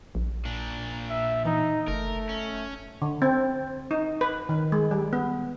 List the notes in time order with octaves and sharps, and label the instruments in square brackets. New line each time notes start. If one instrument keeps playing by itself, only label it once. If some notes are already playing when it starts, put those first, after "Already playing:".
[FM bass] A#1
[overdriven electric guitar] A#2 D4
[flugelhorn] E5
[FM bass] E3 [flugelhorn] D#4
[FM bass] F#1 [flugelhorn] A3 [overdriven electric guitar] A#4
[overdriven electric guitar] C#4
[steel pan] D3
C4
D#4
B4
D#3
G#3
G3
B3